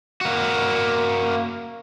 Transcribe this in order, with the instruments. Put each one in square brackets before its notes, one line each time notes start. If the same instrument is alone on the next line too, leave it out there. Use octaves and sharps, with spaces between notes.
[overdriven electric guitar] A#3 F#4